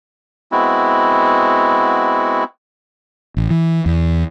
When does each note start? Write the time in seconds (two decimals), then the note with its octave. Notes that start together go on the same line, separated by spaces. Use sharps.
0.52 G#3 B3 C4 E4 F#4
3.37 A1
3.50 E3
3.86 E2